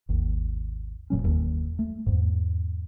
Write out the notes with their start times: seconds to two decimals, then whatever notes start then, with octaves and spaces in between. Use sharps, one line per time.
0.09 G#1 D#2
1.10 D1 A#2 F#3 C#4
1.22 F#1 D#2
1.79 A3
2.06 E2 G#2